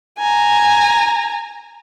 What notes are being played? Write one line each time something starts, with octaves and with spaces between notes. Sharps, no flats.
G#5 A#5